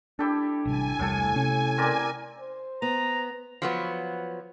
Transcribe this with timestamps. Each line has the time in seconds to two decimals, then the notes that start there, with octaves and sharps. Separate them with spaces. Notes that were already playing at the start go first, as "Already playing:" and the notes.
0.19 D4 E4 G4 A4
0.65 A1 C3 G3 G#5
0.99 E1 C2 A2 C3 G3 A4
1.36 C3 C#4
1.78 C4 A#4 D5
2.40 C5
2.82 B3 A#5
3.62 F3 F#3 B3